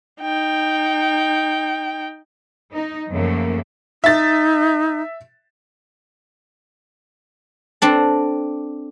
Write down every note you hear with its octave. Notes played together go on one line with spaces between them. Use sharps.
D#4 G5
D#4
F#2 C#3 F3 A3 A#3
D#4 E5 A6
C4 D4 A4